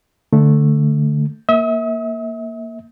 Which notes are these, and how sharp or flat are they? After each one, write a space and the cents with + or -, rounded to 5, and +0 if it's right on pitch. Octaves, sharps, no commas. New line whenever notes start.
D3 +0 A3 +0
A#3 +0 E5 -30 D#6 +40